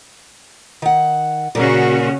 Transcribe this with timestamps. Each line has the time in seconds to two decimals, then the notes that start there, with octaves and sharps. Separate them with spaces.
0.82 D#3 F#5
1.55 A#2 C#3 C#4 F#4 A#4